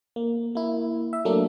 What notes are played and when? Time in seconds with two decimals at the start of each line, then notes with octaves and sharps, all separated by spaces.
0.16 A#3
0.55 A#3 E4
1.13 E5
1.25 F#3 A3 A#3 D4